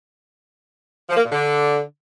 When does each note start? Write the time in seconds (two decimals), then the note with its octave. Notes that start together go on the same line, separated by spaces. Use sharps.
1.09 F3
1.17 A#3
1.24 A#2
1.32 D3